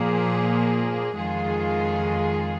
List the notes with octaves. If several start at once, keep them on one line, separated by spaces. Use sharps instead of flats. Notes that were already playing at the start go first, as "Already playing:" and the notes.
Already playing: A#2 F3 A#3 G#4
F2 D#3 G#3 F4 G#4